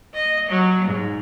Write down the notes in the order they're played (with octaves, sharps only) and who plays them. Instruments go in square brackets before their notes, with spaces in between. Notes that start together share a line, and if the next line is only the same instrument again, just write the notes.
[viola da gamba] D#5
F#3
G#2